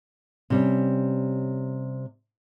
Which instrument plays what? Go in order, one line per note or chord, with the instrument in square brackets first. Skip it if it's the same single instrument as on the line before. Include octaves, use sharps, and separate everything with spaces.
[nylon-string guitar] C3 G3 C#4